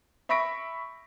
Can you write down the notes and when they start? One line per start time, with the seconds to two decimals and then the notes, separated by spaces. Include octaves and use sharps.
0.29 E5 B5 C#6 A#6 B6 D7